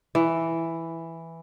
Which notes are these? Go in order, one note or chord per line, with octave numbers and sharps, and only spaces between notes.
E3